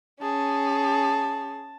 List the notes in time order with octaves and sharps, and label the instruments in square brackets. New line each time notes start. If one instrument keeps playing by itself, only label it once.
[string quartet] C#4 [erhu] G#4 [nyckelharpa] A5